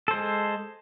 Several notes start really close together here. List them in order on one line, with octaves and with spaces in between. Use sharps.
A4 C5 G#3